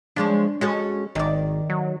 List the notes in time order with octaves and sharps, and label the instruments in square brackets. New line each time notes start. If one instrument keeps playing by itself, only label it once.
[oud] F3 G#3 C#4 [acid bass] D4
[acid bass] G#3 [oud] C#4 F#4 A4
[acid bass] G#1 [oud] D#3 D5
[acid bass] F#3